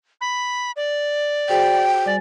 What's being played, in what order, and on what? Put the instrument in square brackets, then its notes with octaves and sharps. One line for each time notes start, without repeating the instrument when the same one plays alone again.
[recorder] B5
D5
[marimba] F#4 G#4 C5 [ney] G5
[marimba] G3 G#5 A6 [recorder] D5